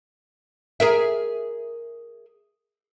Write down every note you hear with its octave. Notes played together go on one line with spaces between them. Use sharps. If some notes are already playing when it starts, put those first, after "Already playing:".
G#4 A#4 E5